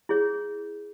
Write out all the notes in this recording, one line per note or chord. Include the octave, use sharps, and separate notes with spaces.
E4 G#4 C#5